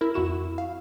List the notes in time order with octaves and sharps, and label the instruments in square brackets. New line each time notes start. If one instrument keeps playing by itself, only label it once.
[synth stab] E4 A#4
F2 E4 F#4 E7
F5